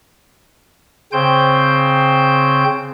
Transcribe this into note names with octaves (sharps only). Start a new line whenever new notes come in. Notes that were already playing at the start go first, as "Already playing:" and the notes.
C#3 C4 C5 G5 G6